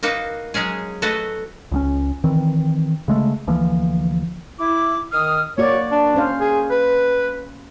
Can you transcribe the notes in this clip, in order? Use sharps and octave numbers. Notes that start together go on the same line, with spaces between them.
A#3 D#4 F#4 B4
F#3 G#3 C#4 G#4
A3 F#4 A4 B4 D#5
C#2 F#3 C#4
D#3 E3 C4
C#3 G#3 A3
D2 E3 F3 A#3
E4 D6
D#3 D#6 F6
A#3 F#4 C#5 D5
D4
C#4 C5 F5
G#4
B4